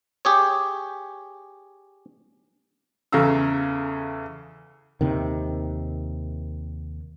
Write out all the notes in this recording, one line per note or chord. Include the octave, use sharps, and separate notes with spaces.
G4 G#4 C#5
E2 C#3 A4 F5 A#5 E6
D#2 C3 D#3